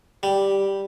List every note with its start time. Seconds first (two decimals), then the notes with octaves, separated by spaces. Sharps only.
0.23 G3 G4